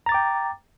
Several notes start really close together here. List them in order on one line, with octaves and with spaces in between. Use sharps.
A#5 A6 D6 G5